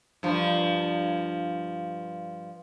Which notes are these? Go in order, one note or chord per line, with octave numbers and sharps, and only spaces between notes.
G2 F3